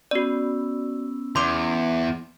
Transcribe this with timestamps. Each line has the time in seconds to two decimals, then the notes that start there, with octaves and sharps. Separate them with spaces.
0.11 B3 C#4 F#4 D5 E6
1.36 E2 C6 D6